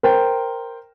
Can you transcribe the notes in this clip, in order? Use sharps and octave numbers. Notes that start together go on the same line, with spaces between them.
A#4 C5 G5